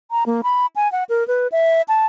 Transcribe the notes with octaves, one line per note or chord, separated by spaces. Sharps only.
A#5
A#3
B5
G#5
F#5
A#4
B4
E5
A5